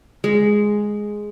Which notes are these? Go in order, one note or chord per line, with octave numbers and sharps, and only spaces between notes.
G#3